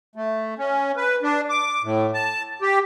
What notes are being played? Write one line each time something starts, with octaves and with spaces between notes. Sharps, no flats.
A3
C#4
B4
D4
D6
A2
A5
G4